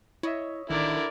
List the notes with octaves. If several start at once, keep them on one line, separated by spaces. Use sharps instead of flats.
E4 C#5 D#5 E5
A1 D3 D#3 E4 A#4 D5